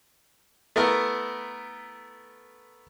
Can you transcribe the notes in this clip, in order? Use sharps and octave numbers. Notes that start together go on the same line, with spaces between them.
A3 B3 E4 A#4